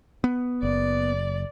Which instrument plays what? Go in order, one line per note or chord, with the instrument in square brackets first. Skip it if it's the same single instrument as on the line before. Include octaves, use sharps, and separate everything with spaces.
[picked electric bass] B3
[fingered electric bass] F#1 [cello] D5